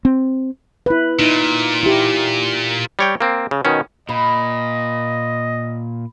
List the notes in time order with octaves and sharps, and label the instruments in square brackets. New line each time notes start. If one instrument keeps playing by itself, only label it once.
[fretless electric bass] C4
[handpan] E4 B4
[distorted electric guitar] A#2 [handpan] D#4
[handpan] E4 G4
[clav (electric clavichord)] G3 C#5 G5
A#3 C4
C#3
B2 D#3 C#4
[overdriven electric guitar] A#2 [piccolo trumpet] D#5 [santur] B5